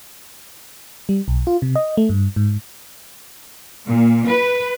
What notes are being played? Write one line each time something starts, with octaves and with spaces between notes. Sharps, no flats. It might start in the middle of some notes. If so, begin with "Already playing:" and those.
G3
B1
F4
C3
D#5
A3
G2
G#2
A#2
B4